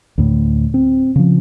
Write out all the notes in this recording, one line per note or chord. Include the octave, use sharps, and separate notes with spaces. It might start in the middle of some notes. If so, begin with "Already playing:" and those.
D2 A2
C4
C#3 F3